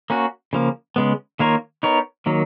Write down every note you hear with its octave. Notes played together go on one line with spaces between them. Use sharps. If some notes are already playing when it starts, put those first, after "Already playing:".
A#3 C#4 F#4
C#3 F3 A#3
C#3 G#3 B3
D#3 A#3 F4 A#4 C#5
B3 D#4 A#4 C#5
D#3 F#3 A#3